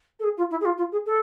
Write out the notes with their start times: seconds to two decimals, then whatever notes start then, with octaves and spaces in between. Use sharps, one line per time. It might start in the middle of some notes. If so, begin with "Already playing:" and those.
0.19 A4
0.23 G#4
0.37 F4
0.51 E4
0.61 G#4
0.65 F4
0.77 F4
0.92 G#4
1.06 A4